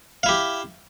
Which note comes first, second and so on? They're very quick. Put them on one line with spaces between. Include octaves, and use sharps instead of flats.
F5 E4 G4